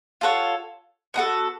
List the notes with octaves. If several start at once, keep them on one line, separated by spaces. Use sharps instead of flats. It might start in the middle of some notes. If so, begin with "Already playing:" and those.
F4 A4 C#5 F#5
B3 D#4 F#4 A4